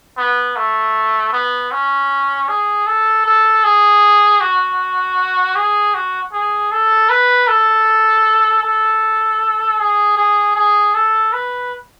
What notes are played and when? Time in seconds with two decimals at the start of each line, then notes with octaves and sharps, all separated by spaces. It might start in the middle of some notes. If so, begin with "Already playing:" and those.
0.17 B3
0.56 A3
1.33 B3
1.72 C#4
2.49 G#4
2.87 A4
3.25 A4
3.64 G#4
4.41 F#4
5.56 G#4
5.94 F#4
6.33 G#4
6.72 A4
7.10 B4
7.48 A4
8.63 A4
9.79 G#4
10.17 G#4
10.56 G#4
10.95 A4
11.33 B4